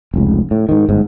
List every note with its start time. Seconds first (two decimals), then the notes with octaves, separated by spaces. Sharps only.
0.14 F1 C#2
0.51 A2
0.69 G#2 D#3
0.89 G1 G#2